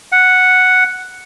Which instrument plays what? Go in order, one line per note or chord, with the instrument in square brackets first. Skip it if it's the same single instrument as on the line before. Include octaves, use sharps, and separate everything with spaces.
[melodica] F#5